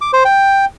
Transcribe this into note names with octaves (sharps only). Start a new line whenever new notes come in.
D6
C5
G5